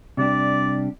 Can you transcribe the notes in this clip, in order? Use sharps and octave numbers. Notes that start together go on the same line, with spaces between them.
C3 G3 D4 G4 D5